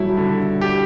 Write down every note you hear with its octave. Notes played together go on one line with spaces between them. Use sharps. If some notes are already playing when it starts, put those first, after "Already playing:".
Already playing: F#3 G3 A3 E4
D3
G4